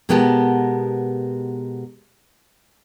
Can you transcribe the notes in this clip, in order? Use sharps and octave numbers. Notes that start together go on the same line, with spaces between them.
B2 G#3 B3 G4 A#4 A5